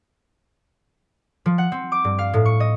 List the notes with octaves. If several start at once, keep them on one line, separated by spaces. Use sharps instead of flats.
F3
F#5
C4
D6
G2
F5
A2
C#6
D#5